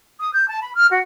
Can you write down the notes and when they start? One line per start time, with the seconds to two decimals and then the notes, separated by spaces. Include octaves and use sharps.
0.20 D#6
0.33 G6
0.48 A5
0.63 B5
0.75 F6
0.90 F#4